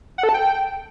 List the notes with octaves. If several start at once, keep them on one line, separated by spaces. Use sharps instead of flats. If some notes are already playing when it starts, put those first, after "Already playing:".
F#5
A4
A5
G5